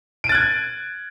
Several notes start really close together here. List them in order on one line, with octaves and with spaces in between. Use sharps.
D7 D#7 A6 F#6 G#6